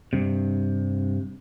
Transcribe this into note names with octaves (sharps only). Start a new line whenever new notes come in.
G2 C3